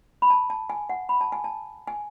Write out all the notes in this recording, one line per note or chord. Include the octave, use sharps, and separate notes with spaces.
B5
A5
A5
G#5
F#5
B5
A5
G#5
A5
G#5